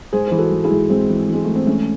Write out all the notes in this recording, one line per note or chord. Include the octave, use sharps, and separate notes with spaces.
G#2 G#4 C5
E3 C5
F#4 A4
G#2
E4 G#4
G#2
G#2 G#3 C4
E3
E3 G#3
E3 A3
C4
G#2 A3 C#4